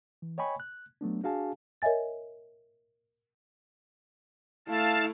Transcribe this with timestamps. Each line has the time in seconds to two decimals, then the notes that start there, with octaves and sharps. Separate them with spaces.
0.22 E3
0.38 C#5 D#5 G5 G#5 B5 C#6
0.60 F#6
1.01 F#3 A3 B3 D4
1.24 D4 F#4 G#4 F5 G#5 A5
1.82 A#4 C#5 D#5 E5 G#5 A6
4.68 A3 E4 F5 A5